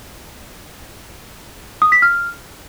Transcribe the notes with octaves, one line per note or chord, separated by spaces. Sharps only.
D#6
B6
F6